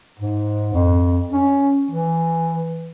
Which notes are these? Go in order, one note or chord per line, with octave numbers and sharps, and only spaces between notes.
G#2
F2
C#4
E3